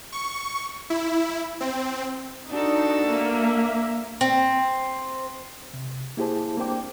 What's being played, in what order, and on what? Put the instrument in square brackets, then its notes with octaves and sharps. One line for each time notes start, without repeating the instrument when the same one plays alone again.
[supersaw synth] C#6
E4
C4
[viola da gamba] D4 F#4 A4 [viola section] D#4
[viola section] A#3 E5
[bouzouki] C4
[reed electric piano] C3
A#3 E4 G4 G#4 C5 A5
A#3 C4 D4 C5 G5 D6